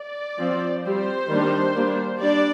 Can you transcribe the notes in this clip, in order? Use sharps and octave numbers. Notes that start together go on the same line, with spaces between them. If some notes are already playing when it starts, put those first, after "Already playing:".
Already playing: D5
F3 C4
G3 C4 C5
D#3 G3 A#3 D4
G3 A#3 D4
G3 D4 D5